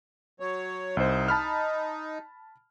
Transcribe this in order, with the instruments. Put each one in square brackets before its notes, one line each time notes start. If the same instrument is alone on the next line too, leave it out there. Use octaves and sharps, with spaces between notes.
[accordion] F#3 C#5
[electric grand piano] C2 C5 [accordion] D#4
[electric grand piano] A5 B5 F6